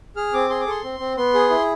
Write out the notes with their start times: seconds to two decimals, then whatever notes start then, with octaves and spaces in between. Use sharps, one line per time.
0.16 G#4 F6
0.34 C4 D6
0.50 G#4 C6
0.60 D6
0.67 A4 C6
0.84 C4
1.00 C4
1.17 B3 C6
1.34 G#4
1.50 E4